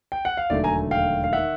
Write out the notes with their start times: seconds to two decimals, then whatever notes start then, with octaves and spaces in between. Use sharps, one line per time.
0.12 G5
0.25 F#5
0.37 F5
0.50 E1 D#2 D3 F#3 A3 D5 E5
0.64 G#5 A#5
0.91 F5 G5
1.24 F5
1.33 D#3 E5 F#5